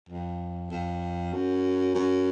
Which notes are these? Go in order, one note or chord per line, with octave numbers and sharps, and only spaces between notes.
F2
F2
F#2
F#2